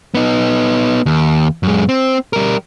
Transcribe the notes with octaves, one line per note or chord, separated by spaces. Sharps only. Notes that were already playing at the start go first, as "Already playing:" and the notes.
B3 D#4
D#2
F#2 G#3
C4
G3 A#4